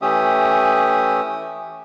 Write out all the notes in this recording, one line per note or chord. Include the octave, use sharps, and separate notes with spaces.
E3 A3 C#4 G4 E5 D#6